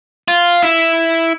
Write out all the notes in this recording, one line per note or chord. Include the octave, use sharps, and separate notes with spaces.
F4
E4